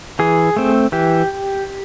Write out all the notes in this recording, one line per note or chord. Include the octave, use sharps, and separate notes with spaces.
E3 G#4
A3 C4
E3 G4